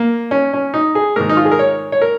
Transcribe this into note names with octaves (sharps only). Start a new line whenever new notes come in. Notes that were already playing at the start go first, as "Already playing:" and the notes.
Already playing: A#3
C#4
C#4
D#4
G#4
G#2 D#3 A#4
D#4
F4
G#4
A#4
C#5
C#5
A#4